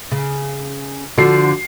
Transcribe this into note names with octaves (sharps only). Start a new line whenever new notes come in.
C#3
D3 F3 F#4 C7